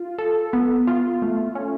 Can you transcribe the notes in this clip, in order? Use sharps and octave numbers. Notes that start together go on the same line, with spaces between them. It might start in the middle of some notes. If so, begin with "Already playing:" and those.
Already playing: F4
A4
B3
F4
A3
C#4